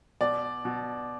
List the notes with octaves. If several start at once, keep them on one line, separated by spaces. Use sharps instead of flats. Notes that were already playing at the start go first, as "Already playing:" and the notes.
B2 D5
B2